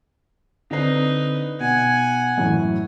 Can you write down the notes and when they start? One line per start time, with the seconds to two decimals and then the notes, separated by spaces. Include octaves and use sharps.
0.71 D3 C4 D#4 B4 C7
1.60 B2 F#5 G#5
2.38 F#2 A2 E3